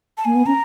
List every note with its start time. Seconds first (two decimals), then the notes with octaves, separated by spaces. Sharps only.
0.18 A5
0.25 A#3 G#5
0.35 B3
0.46 C#4 A#5